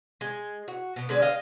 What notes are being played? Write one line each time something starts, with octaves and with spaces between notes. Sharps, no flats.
G#3
F#4
B2 B3
D3 G#3 D5
D#5 F5 G5